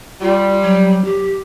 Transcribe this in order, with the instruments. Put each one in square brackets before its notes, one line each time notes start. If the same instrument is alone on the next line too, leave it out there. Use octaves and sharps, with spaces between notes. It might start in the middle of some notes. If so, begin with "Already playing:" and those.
[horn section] G3 [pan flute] F4
[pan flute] F#3
G4